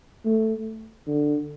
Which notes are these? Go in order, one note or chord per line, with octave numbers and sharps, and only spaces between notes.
A3
D3